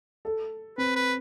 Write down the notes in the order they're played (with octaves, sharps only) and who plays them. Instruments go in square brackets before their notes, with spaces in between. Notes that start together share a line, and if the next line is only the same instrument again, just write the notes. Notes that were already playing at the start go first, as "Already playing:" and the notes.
[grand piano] A4
[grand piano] C4 [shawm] B4
[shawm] B4